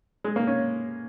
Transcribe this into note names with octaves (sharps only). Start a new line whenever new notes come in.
G#3
A#3
C#4